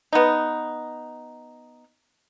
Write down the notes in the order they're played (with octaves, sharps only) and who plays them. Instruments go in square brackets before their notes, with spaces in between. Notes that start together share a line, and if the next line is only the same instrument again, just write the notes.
[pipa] B3 D#4